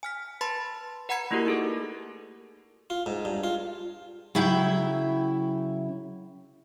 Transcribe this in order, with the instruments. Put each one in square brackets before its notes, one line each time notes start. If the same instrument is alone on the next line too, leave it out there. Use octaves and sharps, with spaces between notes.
[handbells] G#5 F6 B6
B4 A5 B5 C6 A6
B4 F#5 A#5 B5 G#6 C#7
A3 A#3 E4 F#4 G4 A#4
D#4 G#4 A4
[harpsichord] F4
G#2
G2
F4
[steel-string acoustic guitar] C#3 F#3 E4 E5 G5